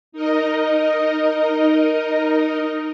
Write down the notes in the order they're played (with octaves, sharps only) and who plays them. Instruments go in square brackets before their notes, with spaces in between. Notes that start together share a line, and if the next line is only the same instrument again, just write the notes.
[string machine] D#4 A#4 D#5